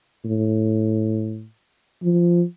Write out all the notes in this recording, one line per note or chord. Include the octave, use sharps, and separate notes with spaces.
A2
F3